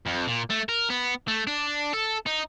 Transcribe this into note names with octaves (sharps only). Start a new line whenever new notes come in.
F2
A#2
A3
A#4
B3
A3
D4
A4
D#4